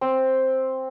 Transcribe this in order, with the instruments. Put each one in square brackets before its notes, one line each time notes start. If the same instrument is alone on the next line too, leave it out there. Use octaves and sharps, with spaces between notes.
[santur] C4